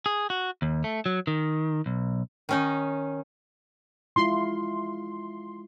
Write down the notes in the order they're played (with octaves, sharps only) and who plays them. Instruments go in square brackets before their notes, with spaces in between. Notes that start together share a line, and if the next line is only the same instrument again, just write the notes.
[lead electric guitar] G#4
F#4
D#2
A3
F#3
D#3
B1
[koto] D#3 C#4 D#4
[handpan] G#3 E4 F4 [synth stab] C6